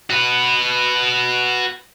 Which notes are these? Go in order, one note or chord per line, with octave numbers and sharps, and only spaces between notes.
F#4 B4